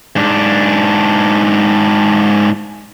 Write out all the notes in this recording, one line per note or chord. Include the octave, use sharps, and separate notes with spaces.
G#2 D4